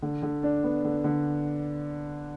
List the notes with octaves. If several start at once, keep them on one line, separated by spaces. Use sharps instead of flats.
D3
D3
D4
B3
D3
D3